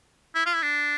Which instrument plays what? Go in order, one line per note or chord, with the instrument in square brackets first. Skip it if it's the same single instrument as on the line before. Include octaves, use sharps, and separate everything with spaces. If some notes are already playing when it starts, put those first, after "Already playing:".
[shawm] E4
F4
E4
D4